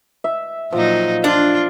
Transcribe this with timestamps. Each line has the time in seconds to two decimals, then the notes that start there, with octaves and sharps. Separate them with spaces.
0.24 E5
0.72 A#2 F3 F#3 D#4
1.24 D4 F4